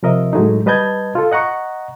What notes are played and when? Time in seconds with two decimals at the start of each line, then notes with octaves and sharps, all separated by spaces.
0.03 C3 F3 A#4 D#5 E5
0.33 A2 F#3 G#3 A3 D#4
0.66 G3 B4 D#5 A5 G6 G#6
1.15 F4 A4
1.32 D#5 F#5 A#5 C#6